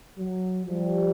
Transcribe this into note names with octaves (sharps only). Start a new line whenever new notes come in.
F#3
F3 G3